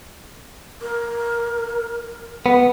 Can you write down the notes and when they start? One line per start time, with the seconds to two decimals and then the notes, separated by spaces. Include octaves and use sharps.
0.81 A#4
2.46 B3